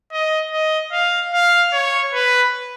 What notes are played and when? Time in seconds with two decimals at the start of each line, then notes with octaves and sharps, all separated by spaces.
0.12 D#5
0.51 D#5
0.92 F5
1.33 F5
1.73 C#5
2.14 B4